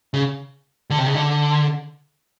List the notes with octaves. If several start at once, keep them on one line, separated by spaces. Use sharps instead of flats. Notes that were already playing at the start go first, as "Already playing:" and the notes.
C#3
D3
C3
C#3
D3